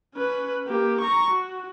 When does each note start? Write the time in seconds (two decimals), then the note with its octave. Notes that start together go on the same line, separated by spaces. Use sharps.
0.15 C#4 B4
0.67 A#3 G4
1.01 A#5 C#6
1.31 F#4